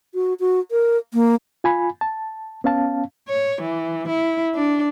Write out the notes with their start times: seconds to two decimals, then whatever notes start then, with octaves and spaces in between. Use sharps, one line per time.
0.14 F#4
0.40 F#4
0.71 A#4
1.14 A#3
1.64 F4 G#5 B5
2.01 A5
2.64 B3 C#4 F5 A5
3.29 C#5
3.62 E3
4.08 E4
4.55 D4